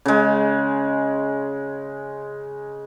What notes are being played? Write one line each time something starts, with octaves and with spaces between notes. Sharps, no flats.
C#3 G#3